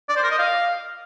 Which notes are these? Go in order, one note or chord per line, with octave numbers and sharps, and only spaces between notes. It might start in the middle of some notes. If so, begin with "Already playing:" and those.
D5
C5
A#4
D#5
F5